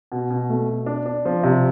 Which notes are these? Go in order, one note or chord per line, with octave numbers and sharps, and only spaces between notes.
B2
B2
A3
B2
D4
D4
F3
C3